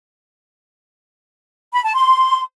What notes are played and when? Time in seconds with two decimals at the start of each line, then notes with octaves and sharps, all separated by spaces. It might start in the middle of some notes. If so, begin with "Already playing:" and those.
1.73 B5
1.84 A5
1.95 C6